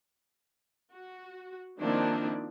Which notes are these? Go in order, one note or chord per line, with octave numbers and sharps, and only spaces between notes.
F#4
D#3 F3 A#3 C4 D4 E4